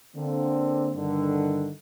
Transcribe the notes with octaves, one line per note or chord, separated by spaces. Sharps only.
D3 A#3 C4
G2 D3 D#3